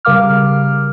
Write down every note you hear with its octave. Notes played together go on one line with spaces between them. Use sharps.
C#3 G3 A#4 F5 D6 F6